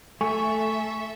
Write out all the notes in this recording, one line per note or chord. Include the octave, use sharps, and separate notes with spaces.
A3 A4 E5 G#5 C#6